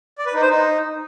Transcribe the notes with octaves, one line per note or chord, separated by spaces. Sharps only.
D5
B4
D#4
C5
D#4